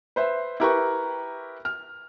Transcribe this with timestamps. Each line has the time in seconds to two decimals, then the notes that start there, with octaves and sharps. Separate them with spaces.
0.16 B4 C5 E5
0.60 E4 G4 A#4 B4 G5 C#6
1.65 F6